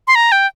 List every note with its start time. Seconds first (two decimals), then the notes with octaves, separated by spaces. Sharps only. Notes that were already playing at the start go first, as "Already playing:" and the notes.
0.07 C6
0.15 A#5
0.32 G5